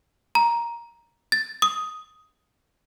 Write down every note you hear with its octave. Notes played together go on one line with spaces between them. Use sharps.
A#5
A6
D#6